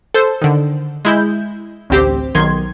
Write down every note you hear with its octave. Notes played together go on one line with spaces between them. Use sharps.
A4 C5
D3 D#3
G#3 E4 G6
A1 D2 C4 G4 C5
B1 D#3 C6 G#6